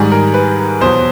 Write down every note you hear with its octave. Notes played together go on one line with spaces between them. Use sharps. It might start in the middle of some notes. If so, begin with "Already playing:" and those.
Already playing: G#2 D#3 G3 G#4
A#4
B4
E2 B2 F#3 C5